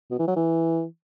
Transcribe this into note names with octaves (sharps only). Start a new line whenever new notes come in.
B2
E3
F#3
E3